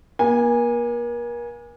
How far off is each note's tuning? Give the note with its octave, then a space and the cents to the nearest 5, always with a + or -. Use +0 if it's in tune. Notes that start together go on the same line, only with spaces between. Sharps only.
A#3 +40 G#5 -15